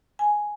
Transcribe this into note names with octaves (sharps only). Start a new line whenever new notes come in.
G#5